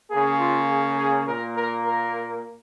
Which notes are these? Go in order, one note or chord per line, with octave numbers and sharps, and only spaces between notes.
C#3 A#3 G#4
F4
G#4
G#4
A#2 A#3 A#4
A#4
A#4